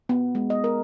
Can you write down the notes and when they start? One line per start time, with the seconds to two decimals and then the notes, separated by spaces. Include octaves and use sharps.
0.09 B3
0.35 G#3
0.50 D#5
0.64 A#4